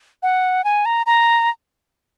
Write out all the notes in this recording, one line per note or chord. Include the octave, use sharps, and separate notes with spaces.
F#5
G#5
A#5
A#5